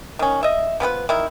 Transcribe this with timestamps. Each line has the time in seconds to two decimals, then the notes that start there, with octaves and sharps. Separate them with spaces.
0.19 D#3 C#4
0.43 D#5 E5
0.80 F3 B3 G#4 B4
1.09 D#3 E4